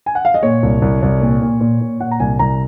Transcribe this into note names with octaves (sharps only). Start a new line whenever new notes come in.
G#5
F#5
F5
D#5
A#2 C#5
C2
C2
C2
A#2
A#2
A#2
A#2
A#2 F#5
A#5
C2 G#5
C2 A#5